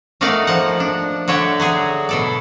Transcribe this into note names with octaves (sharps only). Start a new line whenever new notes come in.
A3 A#3 D#4 F#4 D5 F5
F3 F#5
D4
D3 F#4 C#5 E5 G5 A5
F#3 F#4 G#4
B2 A4 D5